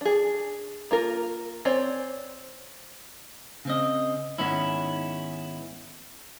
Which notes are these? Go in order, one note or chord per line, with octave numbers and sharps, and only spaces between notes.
D4 G#4
A#3 F4 A#4
C4 C#5 D5 G#5
C#3 C4 D#5
G#2 D#3 B3 C#4 E4